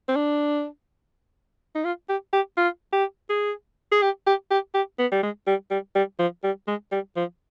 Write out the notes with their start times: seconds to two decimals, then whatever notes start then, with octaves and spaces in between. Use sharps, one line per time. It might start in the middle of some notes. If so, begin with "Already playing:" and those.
0.08 C4
0.16 D4
1.75 D#4
1.84 F4
2.09 G4
2.33 G4
2.57 F4
2.93 G4
3.29 G#4
3.92 G#4
4.02 G4
4.27 G4
4.51 G4
4.74 G4
4.99 B3
5.12 G3
5.23 G#3
5.47 G3
5.70 G3
5.95 G3
6.19 F3
6.43 G3
6.67 G#3
6.91 G3
7.16 F3